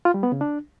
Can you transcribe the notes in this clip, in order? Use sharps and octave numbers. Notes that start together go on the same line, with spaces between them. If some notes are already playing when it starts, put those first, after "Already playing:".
F4
G3
B3
C#3
D4